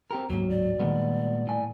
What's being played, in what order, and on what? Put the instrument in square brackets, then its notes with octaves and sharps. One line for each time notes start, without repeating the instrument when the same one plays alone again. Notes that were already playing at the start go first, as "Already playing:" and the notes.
[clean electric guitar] C4 G4 A#4
[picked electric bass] D1 G#2 [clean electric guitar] F#3 [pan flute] A#3
[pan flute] D5
[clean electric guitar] A#2 G#3 B3 [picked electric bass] D#3 G3
[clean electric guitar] A2 G#5